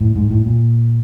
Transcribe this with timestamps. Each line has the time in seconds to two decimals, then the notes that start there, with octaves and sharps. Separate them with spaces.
0.01 A2
0.16 G#2
0.31 A2
0.46 A#2